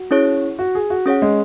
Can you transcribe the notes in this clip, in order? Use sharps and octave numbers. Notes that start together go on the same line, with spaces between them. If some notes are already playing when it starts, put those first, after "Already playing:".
Already playing: F#4
C#4 E4 G#4 C#5
F#4
G#4
F#4
C#4 G#4 C#5 F#5
G#3